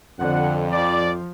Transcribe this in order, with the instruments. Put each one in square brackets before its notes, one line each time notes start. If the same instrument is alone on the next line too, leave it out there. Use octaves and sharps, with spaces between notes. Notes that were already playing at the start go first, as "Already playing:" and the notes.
[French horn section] F2 [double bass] D3 [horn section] F#5
[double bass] F3 [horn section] D5